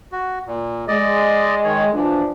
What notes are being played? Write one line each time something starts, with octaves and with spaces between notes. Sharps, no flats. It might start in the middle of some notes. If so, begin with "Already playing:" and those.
F#4
A#2
G#3 D5 D#5
D#3 C#5
E3 F3 D4